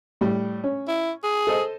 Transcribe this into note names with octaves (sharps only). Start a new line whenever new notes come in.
A2 G3
C#4
E4
G#4
A4 C5 D#5